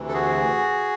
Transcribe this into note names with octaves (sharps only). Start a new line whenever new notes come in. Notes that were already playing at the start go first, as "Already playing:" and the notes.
Already playing: D2 C3 E3
A4
F#4 G#4